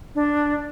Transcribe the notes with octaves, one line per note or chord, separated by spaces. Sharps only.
D4